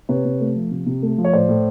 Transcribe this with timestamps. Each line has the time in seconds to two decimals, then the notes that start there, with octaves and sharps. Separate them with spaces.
0.09 C3 B4 C#5
0.25 C3
0.41 A3
0.56 F3
0.71 C3
0.86 C3
1.02 A3
1.18 F3
1.25 C#5
1.33 A2 C5 D5
1.49 A2